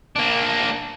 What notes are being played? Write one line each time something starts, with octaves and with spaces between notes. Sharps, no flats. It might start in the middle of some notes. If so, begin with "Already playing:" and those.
A#3 D4